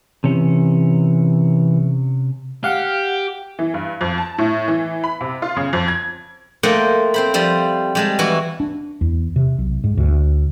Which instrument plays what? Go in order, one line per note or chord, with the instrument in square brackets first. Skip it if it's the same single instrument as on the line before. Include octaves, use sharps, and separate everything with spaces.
[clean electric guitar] C3 C#4 [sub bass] E3
[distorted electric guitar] G4 [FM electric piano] F5 F#5
[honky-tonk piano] E3
G2
F2
A5
A2
E3
B5
C3
F4
C#3
F2
G#6
[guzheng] A3 A#3 C5 D#5 F#5 G5
C4 C5 B5
F3 G3 C5
G3 G#3 A5
E3 E4 F#4
[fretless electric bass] D4
E2
C3
B1
G#2
D2